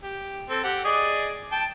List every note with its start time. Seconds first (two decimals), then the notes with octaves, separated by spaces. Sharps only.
0.03 G4
0.50 C4 A4
0.64 G4 F#5
0.85 G#4 D5 D#5
1.52 G5 A5